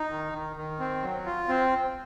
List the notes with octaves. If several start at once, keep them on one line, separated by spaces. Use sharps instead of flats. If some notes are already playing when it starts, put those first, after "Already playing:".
Already playing: D#4
D#3
D#3
D#3
C4
F#3
F4
C4